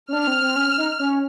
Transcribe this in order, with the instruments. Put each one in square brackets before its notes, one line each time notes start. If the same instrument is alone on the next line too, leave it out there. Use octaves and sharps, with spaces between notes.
[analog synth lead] C#4
[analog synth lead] D4 [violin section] F6
[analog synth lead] C4
C4
C#4
D#4
C#4